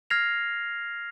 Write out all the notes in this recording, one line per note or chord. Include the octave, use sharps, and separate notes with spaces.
F6 G#6 A#6 C7 F7